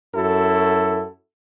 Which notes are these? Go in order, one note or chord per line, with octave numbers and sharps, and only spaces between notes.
F#2 E4 F#4 A4